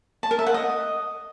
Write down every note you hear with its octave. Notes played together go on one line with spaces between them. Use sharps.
A5
A#4
E5
F#5
D#5